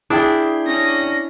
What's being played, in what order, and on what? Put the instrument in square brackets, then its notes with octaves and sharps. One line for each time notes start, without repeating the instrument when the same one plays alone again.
[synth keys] D4 [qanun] E4 [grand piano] G#4 G5
[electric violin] C#4 A#6